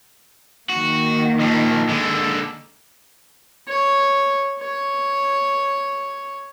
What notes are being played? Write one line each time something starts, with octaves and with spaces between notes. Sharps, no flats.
D#3 A#3 F#4
A#2 F3
D3 G#3
C#5
C#5